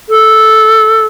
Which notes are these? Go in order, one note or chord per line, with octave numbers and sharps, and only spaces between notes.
A4